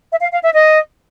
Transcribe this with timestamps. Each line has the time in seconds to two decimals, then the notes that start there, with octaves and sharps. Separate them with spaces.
0.11 E5
0.22 F5
0.32 F5
0.44 E5
0.54 D#5